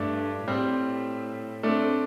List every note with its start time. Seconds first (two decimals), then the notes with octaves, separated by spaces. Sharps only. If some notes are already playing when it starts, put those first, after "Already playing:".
Already playing: G2 A3 D4
0.47 A2 G3 C4
1.63 A3 C4 D4